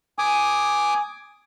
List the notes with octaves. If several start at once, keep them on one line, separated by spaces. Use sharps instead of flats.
G#5 D6 D#6